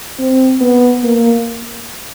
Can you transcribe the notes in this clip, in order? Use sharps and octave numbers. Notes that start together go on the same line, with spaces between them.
C4
B3
A#3